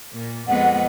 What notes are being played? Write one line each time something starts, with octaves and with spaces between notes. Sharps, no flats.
A#2
F2 G#3 B3 F#5